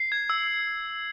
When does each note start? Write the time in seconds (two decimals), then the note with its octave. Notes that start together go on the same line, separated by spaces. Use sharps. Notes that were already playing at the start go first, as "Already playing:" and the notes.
Already playing: C7
0.12 G#6
0.30 E6